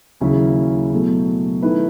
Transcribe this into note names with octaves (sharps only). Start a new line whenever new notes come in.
D#2 C#3 F#3 C#4 E4
B2 F#3 A3
D#3 A3 E4 B4